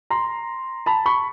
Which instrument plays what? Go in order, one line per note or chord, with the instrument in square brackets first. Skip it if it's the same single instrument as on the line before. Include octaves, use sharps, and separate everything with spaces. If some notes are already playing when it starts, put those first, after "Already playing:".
[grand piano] A#5 C6
A5 B5
B5 C#6